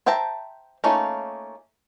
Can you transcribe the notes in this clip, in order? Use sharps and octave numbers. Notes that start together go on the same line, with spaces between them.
C5 E5 G5 A5 A#5
A3 A#3 C#4 D#4 F4